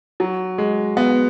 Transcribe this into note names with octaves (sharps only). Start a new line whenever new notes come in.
F#3
G#3
B3